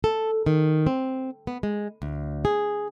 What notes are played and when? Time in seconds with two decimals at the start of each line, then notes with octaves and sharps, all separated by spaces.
0.04 A4
0.46 D#3
0.87 C4
1.47 B3
1.63 G#3
2.02 D2
2.45 G#4